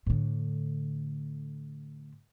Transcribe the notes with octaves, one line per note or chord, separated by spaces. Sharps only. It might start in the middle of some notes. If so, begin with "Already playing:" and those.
A2 D3